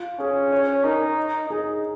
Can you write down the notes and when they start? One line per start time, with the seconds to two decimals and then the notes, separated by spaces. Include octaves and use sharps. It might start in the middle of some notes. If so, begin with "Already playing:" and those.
Already playing: F4
0.19 C#4 G#4
0.52 C#5
0.84 D#4 A#4
1.50 D#4 G#4